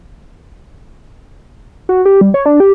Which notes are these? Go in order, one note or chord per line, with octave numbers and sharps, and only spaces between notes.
F#4
G4
G3
C#5
D4
G4